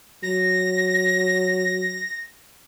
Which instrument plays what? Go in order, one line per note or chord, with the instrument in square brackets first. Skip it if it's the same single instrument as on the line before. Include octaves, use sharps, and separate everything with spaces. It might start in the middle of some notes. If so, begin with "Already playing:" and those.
[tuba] F#3 [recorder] A#6